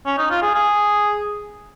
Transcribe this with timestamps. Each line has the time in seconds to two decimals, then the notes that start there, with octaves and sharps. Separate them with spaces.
0.06 C#4
0.18 D#4
0.30 F4
0.42 G#4
0.54 G#4